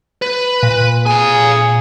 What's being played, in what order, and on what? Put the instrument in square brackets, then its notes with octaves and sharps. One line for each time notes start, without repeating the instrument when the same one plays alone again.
[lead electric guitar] B4
[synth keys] A#2
[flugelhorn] G#4 [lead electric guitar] F5 G#5